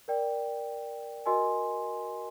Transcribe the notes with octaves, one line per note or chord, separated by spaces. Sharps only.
A#4 D5 G5
F#4 A#4 D#5 G#5 C6